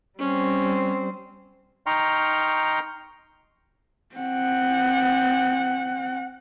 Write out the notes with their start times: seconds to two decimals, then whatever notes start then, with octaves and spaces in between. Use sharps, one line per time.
0.20 G3 C4 C#4
1.86 D#4 G5 A#5 C6 C#6 F6
4.15 C4 F#5